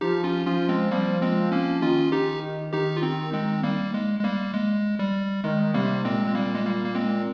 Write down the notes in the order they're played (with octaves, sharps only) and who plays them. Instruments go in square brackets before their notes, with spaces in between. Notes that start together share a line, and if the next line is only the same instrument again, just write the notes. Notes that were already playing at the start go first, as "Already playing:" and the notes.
[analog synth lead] F3 [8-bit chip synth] D#4 G4
[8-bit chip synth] C#4 F4
[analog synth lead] F3 [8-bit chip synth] C#4 F4
[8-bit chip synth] G#3 C4
[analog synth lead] F3 [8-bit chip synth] G3 A#3
[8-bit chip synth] G#3 C4
A#3 C#4
[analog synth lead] D#3 [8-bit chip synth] C#4 F4
[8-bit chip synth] D#4 G4
[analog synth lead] D#3 [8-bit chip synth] D#4 G4
[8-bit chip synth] F4
C4 D#4
G#3 C4
G3 A#3
G#3
G#3
G3 A#3
G#3
G3
[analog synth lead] D#3 [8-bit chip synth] G#3
[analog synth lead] C3 [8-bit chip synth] G3 A#3
[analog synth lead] A#2 [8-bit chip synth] G#3 C4
[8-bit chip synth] G#3
G3 A#3
G#3
G3 A#3
A#3
G#3 C4